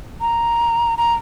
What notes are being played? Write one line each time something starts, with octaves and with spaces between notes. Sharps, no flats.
A#5
A#5